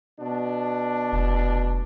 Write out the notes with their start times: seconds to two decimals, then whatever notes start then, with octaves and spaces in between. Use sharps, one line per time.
0.19 B2 D4
1.13 F1